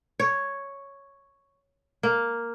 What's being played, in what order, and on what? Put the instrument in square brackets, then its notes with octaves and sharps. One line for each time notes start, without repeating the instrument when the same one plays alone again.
[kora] C#5
A#3